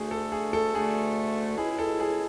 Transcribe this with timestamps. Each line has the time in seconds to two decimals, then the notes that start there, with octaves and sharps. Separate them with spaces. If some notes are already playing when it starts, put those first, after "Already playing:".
Already playing: D2 D3 A3 G#4
0.11 A4
0.32 G#4
0.53 A4
0.74 D2 D3 A3 G#4
1.58 C#2 B2 G#3 C#4 E4 G#4
1.79 A4
2.00 G#4